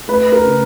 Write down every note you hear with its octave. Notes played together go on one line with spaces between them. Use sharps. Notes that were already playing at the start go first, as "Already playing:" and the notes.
A3 B4
A#4
C#3